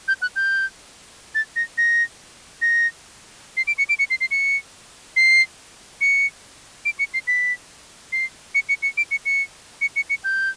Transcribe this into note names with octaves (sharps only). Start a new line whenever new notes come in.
G6
F#6
G6
A6
A#6
A#6
A#6
C7
D7
C#7
D7
C#7
C7
C7
C#7
C7
C#7
D7
C#7
C7
B6
C7
C#7
C#7
C#7
D7
C#7
C#7
C#7
C#7
C#7
G6